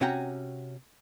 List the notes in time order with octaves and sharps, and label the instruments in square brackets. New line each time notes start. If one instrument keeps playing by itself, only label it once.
[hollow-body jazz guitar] C3 C#4 F#4 F#5 G5 A#5